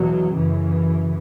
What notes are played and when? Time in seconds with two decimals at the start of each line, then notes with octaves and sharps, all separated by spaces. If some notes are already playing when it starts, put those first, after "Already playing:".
Already playing: E2 B2 F#3
0.33 F#2 C#3 E3